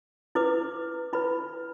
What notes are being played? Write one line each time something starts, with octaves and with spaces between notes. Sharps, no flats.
E4 B4 D6
E4 B4 B5